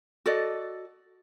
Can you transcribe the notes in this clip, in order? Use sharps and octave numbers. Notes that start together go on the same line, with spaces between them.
F#4 A4 D5 D#5